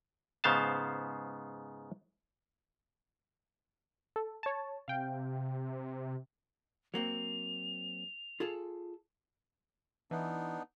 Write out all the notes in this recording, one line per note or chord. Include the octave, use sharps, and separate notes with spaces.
G#2 C#3 B3 C5 F5 A5
A4
C#5 A5
C3 F5 G5
F#3 A#3 C4 F7
F4 G#4 A4
E3 B3 D4 D#4